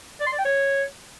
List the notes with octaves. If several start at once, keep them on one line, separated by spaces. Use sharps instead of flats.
D5
C6
D5
G5
C#5